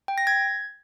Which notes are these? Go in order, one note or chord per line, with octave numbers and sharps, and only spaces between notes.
G5
A#6
G#6